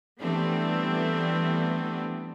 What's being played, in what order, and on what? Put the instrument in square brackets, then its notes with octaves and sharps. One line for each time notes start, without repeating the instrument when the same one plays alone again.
[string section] E3 G3 A3 B3 C4 D4